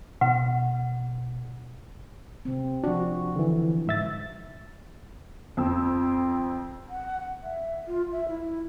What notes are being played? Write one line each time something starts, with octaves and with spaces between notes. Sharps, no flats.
B2 F#5
C3 C4
F3 D4 F#4
D3 E3
G#2 E5 A6
F2 C4 E6
F#5
E5
F4
E5
E4